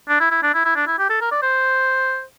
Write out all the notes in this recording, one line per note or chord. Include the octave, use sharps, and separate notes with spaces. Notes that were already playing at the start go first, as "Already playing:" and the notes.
D4
E4
E4
D4
E4
E4
D4
E4
G4
A4
A#4
D5
C5